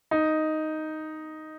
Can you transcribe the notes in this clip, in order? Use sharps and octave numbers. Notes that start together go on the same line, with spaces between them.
D#4